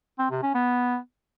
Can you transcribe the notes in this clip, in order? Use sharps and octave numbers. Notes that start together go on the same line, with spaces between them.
C4
C3
C#4
B3